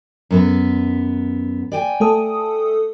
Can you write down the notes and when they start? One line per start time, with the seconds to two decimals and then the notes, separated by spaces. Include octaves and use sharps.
0.30 F#2 B3 B4
1.72 D5 G5 G#5
2.00 A3 A4 D#6